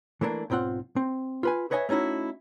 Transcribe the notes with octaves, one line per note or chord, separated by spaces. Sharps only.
E3 A3 A#3 D4
B1 G#2 C4 F4 F#5
C4
F4 B4 G#5
B4 C#5 D#5 E5 G#5
A3 C#4 D#4 E4 F#4